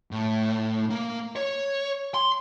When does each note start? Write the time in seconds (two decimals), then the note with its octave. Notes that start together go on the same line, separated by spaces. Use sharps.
0.11 A2
0.90 A#3
1.36 C#5
2.14 C6